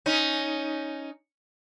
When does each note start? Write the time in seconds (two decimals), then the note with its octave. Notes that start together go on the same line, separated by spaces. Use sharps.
0.06 C#4 D#4